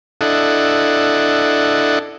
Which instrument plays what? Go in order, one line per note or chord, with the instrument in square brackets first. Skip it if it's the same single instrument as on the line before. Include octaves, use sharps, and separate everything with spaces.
[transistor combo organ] D4 E4 A4 D#5 F#5